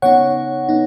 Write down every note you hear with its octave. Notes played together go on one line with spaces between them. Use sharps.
C#3 B3 D#4 C#5 F#5
B3 D#4